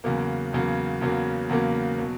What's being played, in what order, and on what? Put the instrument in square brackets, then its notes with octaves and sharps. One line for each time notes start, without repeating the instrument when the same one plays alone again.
[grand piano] E2 C#3 F#3 A#3
E2 C#3 F#3 A#3
E2 C#3 F#3 A#3
E2 C#3 F#3 A#3
B2 F#3